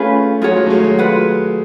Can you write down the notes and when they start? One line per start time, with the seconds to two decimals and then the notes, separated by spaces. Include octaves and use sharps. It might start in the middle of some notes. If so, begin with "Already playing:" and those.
Already playing: A3 C#4 F4 G#4 B4
0.41 F#3 F4 G#4 C#5 F#5
0.56 F#3
0.67 A3
0.70 G#3
0.84 F#3
0.99 F4 B4 F#5